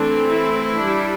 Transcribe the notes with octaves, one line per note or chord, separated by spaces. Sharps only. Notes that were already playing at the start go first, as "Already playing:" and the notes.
Already playing: E3 A3 C4 D4
E4
G3 D4